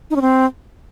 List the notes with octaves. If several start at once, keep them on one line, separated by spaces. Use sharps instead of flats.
D#4
C#4
C4